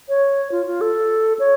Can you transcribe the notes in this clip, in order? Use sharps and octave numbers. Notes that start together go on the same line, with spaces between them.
C#5
F4
F4
A4
C#5